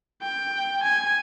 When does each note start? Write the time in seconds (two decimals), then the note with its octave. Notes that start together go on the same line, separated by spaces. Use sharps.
0.22 G5
0.83 G#5